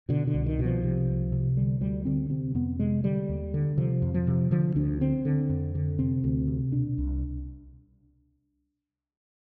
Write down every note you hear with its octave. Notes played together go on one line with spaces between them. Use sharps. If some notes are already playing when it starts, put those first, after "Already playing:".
B2 D3
D3
C2
D#3
B2
F3
C3
C2
C3
D3 G3
D2 G3
D3 C4
C3 C4
F2 B3
C3 G#3
D3 G3
D#2
D3
C3 F3
F2
F3
C3
D3 F3
D2 D4
D3 C4
D3
F2
D3
C3 C4
D2
C3
B2 D4
C2